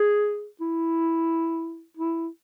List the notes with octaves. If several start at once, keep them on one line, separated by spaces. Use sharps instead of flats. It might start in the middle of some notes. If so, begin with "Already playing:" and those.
Already playing: G#4
E4
E4